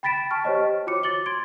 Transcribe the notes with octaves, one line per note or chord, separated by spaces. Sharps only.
G5 B5 A6 B6 D7 E7
G5 A5 C#6 F6
G4 C5 C#5 D#5
F4 F#4 C#5 D6 C#7
D6 A6 F#7 G7
C6 G#6 D7 G7